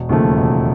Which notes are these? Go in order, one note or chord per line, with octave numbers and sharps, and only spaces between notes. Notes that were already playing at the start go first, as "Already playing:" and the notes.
Already playing: E1
D#2 C#3 F3 A3
E1